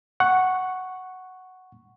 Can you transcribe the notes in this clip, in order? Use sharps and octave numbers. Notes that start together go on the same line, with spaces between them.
F#5 C#6